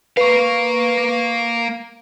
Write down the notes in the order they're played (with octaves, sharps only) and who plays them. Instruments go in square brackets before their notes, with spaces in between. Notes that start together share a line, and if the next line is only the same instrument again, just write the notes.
[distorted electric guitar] A#3 F5 [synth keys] B4 C#6